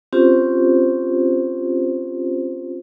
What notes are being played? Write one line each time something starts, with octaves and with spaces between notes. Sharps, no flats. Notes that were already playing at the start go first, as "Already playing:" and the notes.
C4 C#4 F4 G4 C5